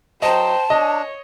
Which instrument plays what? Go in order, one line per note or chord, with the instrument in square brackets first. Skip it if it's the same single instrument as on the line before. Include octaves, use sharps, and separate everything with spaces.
[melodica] F#3 [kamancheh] C5 G5 [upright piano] D#5 [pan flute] A5
[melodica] D4 [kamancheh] C#5 [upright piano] D#5